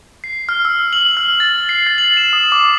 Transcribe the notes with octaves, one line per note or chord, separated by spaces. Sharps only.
C7
F6
E6
F#7
F6
A6
C7
A6
F#7
E7
D#6
D6